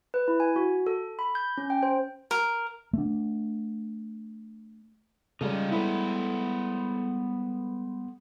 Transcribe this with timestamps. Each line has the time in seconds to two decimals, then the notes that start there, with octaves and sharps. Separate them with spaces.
0.14 B4
0.28 E4
0.40 G#5
0.56 F#4
0.87 A4
1.19 B5
1.35 G6
1.58 C#4
1.70 G5
1.83 C5
2.31 A#4
2.93 A3 D4
5.41 C#3 G3 G#3 D#4 F4 A4
5.72 A3 B3 E4 B4 C5